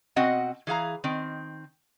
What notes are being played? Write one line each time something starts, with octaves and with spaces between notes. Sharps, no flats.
B2 C4 F#4 D#5 F#5
E3 G#4 F5 A#5
D#3 C4